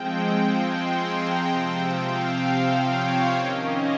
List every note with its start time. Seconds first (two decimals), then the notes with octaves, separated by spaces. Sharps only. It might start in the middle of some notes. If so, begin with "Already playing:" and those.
Already playing: F3 G#3 C4 G5
0.51 C6
0.99 A#5
1.45 C3 F3 C4 G5
1.91 F5
2.85 C#5
3.33 D#3 A#3 C#4 D#5